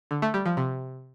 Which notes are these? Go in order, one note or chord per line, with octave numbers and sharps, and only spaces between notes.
D3
A3
G3
F3
C3